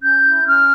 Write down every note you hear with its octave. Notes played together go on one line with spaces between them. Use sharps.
C#4 G6
E4
C#4 F6